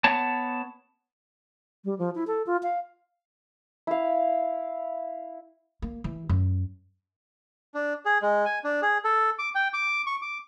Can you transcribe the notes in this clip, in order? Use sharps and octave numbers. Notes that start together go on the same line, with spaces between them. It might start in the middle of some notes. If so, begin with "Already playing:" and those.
B3 C#5 A5
G3
F3
E4
A4
F4
F5
E4 F5
A#3
E3
F#2
D4
G#4
G#3
G#5
D4
G#4
A4
D6
G5
D6
C#6
D6